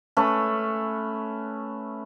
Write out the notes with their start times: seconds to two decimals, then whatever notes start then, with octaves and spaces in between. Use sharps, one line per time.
0.17 A3 C#4 B4